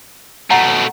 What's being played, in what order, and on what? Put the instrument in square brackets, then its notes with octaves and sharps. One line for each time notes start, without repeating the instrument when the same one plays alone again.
[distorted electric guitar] B2 A3 [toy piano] F#5 A#5